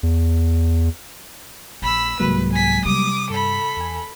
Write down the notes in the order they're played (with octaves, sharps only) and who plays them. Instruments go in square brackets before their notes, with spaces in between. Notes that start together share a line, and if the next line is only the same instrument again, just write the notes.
[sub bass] E2
[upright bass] A#1 [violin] B5 E6
[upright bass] C2 G#2 [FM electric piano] F#3 G#3 A#3 [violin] B4
[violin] G#5 B6
[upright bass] C3 G3 [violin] D6 D#6
[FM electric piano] G2 [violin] A4 B5
[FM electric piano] E2 G#5